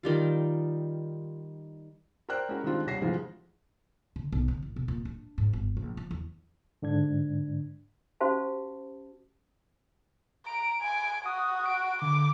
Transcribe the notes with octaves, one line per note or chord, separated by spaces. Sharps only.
D#3 G3 F4
A#4 C5 D5 G5 F#6
G#3 C#4 E4 F#4 A#4
D#3 G3 G#3 C4 D4 F4
D#1 C2 C#5 A#6 C7
D2 C3 E3 F3 G#3
D3
B1
D3
A1
B2
A#2
D4
G#2
G1
A#1
F3
E2
G#2 D3 D4 G#6
C#4 F#4 G4 C5 F5 A5
A#5 D7
G#5
F#4 D#6
D7
D3 D6